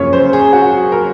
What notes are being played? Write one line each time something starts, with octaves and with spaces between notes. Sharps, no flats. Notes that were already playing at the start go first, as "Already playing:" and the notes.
Already playing: F#2 C#3 F3 A#3 C#4 C#5
C5
G#4
F#4
G#4
A#4